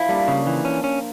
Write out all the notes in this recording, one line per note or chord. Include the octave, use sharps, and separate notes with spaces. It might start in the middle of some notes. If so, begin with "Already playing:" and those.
Already playing: F3 E4
G3 A#3 D4
C#3
E3
C#4
C#4